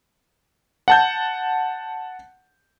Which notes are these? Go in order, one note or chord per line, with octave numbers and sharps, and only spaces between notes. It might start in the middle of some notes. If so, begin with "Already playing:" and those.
F#5 A5 G6